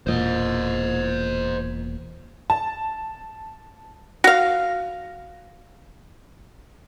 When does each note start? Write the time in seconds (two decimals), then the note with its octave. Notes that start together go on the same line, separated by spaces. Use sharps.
0.07 E1 A#2 C5 D#5
2.50 A5
4.24 F#4 F5